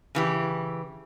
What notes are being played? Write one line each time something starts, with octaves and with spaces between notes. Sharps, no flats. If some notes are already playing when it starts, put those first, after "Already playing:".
C#3 E3 G4